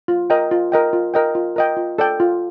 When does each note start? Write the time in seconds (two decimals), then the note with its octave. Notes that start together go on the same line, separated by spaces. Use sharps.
0.08 F4
0.30 A#4 D#5 G5
0.51 F4
0.72 A#4 D#5 G5
0.93 F4
1.14 A#4 D#5 G5
1.35 F4
1.56 A#4 D#5 G5
1.77 F4
1.98 A4 D5 G5
2.20 F4